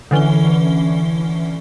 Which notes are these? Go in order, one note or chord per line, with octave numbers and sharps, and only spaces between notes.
D3 E3 C#4 G7